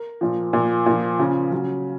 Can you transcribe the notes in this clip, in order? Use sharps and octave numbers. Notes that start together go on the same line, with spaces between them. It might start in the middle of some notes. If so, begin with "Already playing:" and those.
Already playing: A#4
A#2 F3
A#2 F3
A#2 F3
C#3 F3
C#3 F#3